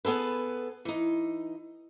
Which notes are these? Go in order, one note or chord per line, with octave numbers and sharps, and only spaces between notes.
B3 G#4 A4 B4
E3 D#4